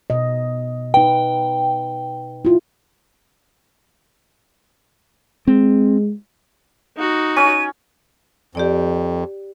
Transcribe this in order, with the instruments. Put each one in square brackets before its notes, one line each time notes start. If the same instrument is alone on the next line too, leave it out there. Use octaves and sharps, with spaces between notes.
[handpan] B2 D#5
[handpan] D#4 B4 [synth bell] G5
[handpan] E4 F4
[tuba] G#3 [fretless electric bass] C4
[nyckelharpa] D#4 F#4
[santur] C#4 C#5 [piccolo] D#7
[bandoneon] F2 [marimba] G4 D5 G5